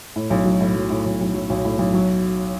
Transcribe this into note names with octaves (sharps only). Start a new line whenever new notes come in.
A2
B1
F#3
A2
F#3
A2
B1
B1
F#3
B1
A2
B1
F#3